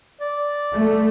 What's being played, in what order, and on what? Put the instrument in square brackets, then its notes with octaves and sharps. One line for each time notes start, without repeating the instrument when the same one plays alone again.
[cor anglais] D5
[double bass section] A3